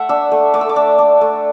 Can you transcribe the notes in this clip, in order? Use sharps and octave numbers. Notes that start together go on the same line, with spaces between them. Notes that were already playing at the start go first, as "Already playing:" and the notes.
Already playing: A3 E5 F#5
D4 E6
A3
A3 D6
E6
D6
D4
D4
A3